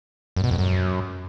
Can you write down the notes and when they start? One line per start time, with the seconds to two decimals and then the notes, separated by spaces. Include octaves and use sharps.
0.36 F#2
0.44 B2
0.51 F2
0.58 F#2